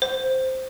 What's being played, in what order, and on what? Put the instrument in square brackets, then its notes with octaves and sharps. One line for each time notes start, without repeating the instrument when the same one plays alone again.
[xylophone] C5